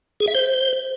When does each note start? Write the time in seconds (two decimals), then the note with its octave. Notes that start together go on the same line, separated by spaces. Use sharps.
0.20 G#4
0.27 E5
0.35 C5